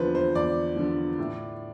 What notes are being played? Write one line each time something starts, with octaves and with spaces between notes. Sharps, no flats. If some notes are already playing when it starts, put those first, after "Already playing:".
Already playing: E2 D3 F3 B4 C5
C5
E2 D5
D3 F3
A2